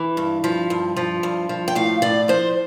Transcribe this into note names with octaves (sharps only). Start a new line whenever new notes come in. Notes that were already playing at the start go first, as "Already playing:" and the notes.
Already playing: E3
G2
F3
G2
F3
G2
F3
G5
A2 F5
A2 D5
F3 C5